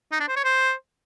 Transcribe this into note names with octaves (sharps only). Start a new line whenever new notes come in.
D#4
D4
C5
C#5
C5